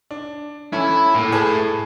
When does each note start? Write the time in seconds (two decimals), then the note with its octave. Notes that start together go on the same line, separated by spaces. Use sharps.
0.11 D4
0.72 E3 C#4 E4 A4
1.15 A2 A#3
1.32 G#4 B4 A5